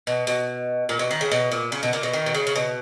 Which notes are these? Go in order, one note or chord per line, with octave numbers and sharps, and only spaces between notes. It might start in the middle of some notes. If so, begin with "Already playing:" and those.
B2
B2
A#2
B2
D#3
C#3
B2
A#2
C#3
B2
A#2
B2
D#3
B2
C#3
C#3
B2